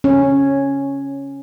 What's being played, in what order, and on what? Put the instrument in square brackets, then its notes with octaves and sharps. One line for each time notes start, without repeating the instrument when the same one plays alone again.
[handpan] C#4